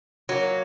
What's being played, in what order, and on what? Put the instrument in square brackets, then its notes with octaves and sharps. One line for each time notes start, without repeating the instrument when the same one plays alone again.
[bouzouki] F#3 A#3